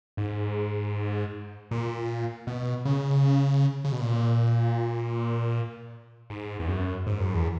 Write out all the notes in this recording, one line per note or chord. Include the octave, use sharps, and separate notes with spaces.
G#2
A#2
B2
C#3
C#3
B2
A#2
G#2
E2
F#2
G#2
F#2
E2